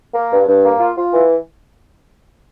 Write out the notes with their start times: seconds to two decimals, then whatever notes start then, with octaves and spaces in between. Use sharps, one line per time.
0.14 A#3
0.31 G2
0.48 G2
0.64 A#3
0.80 F4
0.97 F4
1.13 E3